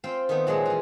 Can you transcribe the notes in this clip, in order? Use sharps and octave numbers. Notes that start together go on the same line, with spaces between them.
C4 F4 C5 G5
D#3 A3 B3
A#2 F#3 G#3 A#3 G#4 A4
E3 F3